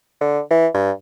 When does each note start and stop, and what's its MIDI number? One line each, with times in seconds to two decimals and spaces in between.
0.21 0.40 50
0.51 0.67 52
0.75 0.91 43